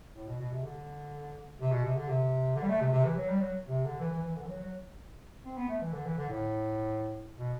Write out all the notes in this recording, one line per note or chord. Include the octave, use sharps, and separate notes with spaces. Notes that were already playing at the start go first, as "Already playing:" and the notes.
A2
B2
B2
C3
D3
C3
B2
C3
D3
C3
D3
G3
A3
C3
C3
E3
F#3
G3
F#3
C3
D3
E3
E3
E3
D3
E3
F#3
F#3
C4
B3
A3
E3
D3
E3
D3
A2
B2